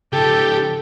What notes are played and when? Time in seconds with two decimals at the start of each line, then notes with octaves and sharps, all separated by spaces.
0.13 C#3 F3 G4 A4